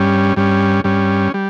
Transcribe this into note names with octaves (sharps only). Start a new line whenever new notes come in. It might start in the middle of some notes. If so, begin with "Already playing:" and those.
Already playing: G2 G3 C#4
G2 G3 C#4
G2 G3 C#4
G3